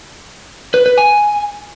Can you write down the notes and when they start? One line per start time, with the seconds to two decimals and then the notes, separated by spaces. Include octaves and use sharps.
0.74 B4
0.86 B4
0.98 G#5